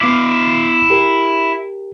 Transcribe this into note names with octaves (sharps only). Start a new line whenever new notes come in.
B3 E4 F5 D6
G4 A#4